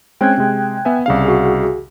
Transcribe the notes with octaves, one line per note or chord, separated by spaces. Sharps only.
G#3 C4 C#4 G5 F#6 G#6
C3 G#3
B3 E5 G#5
C2 C#3 F5
F#4 G#4